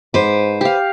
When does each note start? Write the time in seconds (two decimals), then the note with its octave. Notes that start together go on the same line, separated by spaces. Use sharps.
0.14 G#2 B4 C5 D6
0.61 G4 F5